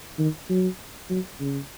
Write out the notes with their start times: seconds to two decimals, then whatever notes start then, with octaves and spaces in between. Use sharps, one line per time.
0.19 D#3
0.50 F#3
1.10 F#3
1.40 C#3